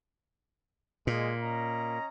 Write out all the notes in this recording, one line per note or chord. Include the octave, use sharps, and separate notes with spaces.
A#2 G#3
C#4 D#5 A#5